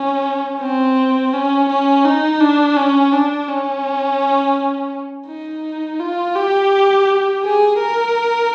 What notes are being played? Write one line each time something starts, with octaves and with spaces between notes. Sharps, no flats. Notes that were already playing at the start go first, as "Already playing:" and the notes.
Already playing: C#4
C4
C#4
C#4
D#4
D4
C#4
D4
C#4
D#4
F4
G4
G#4
A#4